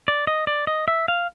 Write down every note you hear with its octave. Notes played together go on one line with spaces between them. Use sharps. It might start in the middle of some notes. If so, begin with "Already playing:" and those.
D5
D#5
D5
D#5
E5
F5